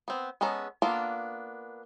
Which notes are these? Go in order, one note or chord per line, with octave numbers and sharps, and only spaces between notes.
B3 C4
G#3 B3 C#4 A4 A#5
A#3 B3 D4 F4 A4